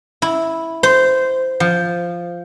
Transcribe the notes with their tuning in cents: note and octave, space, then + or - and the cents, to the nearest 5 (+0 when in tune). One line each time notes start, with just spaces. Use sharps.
E4 -5
C5 -15
F3 -5